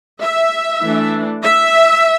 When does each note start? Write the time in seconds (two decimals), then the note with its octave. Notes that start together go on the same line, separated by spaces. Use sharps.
0.22 E5
0.81 E3 A3 D4
1.42 E5